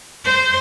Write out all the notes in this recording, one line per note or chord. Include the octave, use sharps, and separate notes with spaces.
C5